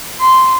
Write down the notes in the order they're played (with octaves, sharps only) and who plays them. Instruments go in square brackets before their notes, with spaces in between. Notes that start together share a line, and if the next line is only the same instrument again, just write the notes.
[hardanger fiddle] C6